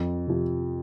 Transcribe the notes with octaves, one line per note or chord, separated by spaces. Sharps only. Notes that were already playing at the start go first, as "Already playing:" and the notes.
Already playing: F2
C3 F3